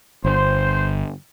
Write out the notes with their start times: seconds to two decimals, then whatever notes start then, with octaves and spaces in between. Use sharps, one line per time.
0.24 G1 C5